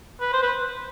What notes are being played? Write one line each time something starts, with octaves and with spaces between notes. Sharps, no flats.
B4
C5
B4